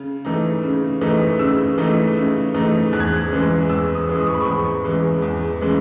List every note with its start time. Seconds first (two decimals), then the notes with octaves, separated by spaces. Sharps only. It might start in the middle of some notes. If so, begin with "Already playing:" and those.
Already playing: C#3
0.25 E3 A3 D#4
0.63 C#3
1.01 E3 A3 D#4
1.39 C#3 E6
1.78 E3 A3 D#4
2.16 C#3
2.54 E3 A3 D#4
2.93 E2 F#6
3.00 G#6
3.07 F#6
3.31 C#3 E3 G#3
3.69 E2 E6
3.95 D#6
4.08 C#3 E3 G#3
4.20 D#6
4.28 C#6
4.35 B5
4.42 E2 C#6
4.84 C#3 E3 G#3
5.22 E2
5.61 C#3 E3 G#3